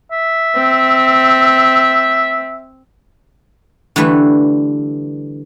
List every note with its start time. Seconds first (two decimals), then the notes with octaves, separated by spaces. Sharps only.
0.11 E5
0.56 C4
3.96 D3 E3 G3 A3 B4